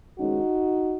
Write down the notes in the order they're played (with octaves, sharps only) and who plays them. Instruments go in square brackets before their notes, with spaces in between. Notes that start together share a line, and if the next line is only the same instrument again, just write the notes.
[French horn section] F2 D#3 G#3 C#4 D#4 F#4